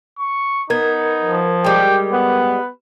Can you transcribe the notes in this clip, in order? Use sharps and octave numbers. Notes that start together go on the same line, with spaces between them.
C#6
B3 D#4 A#4 G#6
F3
G3 G#3 G5
B3 B4